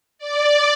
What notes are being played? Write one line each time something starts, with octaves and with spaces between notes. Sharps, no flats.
D5